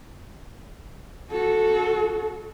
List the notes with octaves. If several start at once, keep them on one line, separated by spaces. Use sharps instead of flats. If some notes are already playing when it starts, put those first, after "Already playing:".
F#4 A4